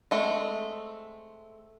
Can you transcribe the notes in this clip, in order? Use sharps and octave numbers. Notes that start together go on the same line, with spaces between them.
G#3 A3 C4